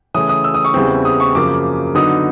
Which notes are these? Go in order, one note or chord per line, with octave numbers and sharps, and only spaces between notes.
C#3 E3 A3 C#4 D#6
D#6
E6
D#6
C#6
E2 C#3 E3 G3 C4
D#6
C#6
F#2 C#3 F3 A#3 D6
D3 F#3 B3 D#4 D#6